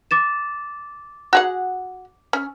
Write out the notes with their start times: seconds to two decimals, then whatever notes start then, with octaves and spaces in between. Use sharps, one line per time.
0.11 D6 A6 E7
1.33 F#4 G#4 F#5
2.33 C#4